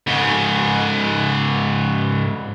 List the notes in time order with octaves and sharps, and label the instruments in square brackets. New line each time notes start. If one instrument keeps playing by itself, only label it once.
[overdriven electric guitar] G#2 C#3